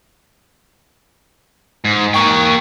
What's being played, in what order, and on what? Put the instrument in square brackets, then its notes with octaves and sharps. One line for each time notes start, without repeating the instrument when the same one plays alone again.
[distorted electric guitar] G#2
[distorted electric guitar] A#3 G5 [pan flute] C#6